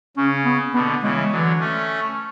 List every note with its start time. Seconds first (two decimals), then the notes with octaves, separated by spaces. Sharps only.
0.17 C#3 C#4
0.45 B3
0.74 B2 D3 B3
1.03 C#3 E3 G#3
1.31 D3 E3 F#3
1.60 A3 C#4